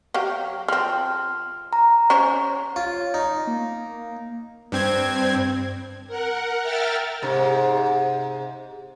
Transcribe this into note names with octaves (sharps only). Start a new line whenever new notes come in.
F#3 G4 F5
F3 C4 F6
A#5
C#4 C5 C#5
F4 C#5
D#4
A#3
G2 C4 G#6
A#4 F#5
A#4 E5 G5 F6 A6
G#2 C3